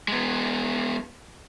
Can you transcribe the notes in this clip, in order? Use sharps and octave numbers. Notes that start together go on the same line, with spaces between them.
G#3 B3